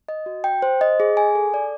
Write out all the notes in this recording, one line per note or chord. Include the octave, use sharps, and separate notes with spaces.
D#5
F#4
G5
C5
D#5
G#4
G#5
A4
D5